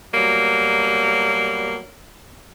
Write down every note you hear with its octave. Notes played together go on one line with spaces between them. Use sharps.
B2 F#3 G3 A#3